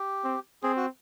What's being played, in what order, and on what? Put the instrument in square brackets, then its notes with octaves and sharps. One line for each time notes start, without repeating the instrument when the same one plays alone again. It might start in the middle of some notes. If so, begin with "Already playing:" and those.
Already playing: [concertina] G4
[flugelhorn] C4
[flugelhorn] C4 [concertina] G#4
[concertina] F#4